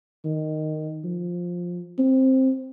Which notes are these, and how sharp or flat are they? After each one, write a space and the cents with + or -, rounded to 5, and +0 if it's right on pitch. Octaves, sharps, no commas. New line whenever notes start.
D#3 -10
F3 +10
C4 +10